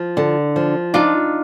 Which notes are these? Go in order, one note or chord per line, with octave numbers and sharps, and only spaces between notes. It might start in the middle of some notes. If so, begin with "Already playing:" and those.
Already playing: F3
D3
F3
D4 D#4 F4